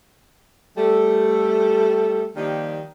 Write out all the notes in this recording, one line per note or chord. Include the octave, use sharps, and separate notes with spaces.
G3 A3 A4
D#3 F3 G3 A#3 D#4 G4